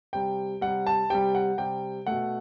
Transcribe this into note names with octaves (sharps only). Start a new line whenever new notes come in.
C3 G3 G5
C3 G3 F#5
A5
C3 G3 G5
F#5
C3 G3 G5
B2 A3 F#5